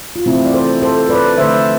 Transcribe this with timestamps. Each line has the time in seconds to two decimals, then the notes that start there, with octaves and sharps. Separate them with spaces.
0.16 F4
0.26 C3 E3 A3 C4 E4
0.46 D5
0.54 A4 C5
0.82 A4 C5
1.09 B4 D5
1.37 D3 F3 A3 C5 E5